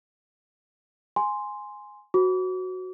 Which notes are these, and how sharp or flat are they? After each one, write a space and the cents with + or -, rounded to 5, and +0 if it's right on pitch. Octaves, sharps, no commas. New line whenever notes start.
G#5 +0 C6 +0
F#4 +0 C5 -15 D6 -35